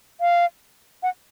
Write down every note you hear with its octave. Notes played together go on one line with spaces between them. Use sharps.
F5
F#5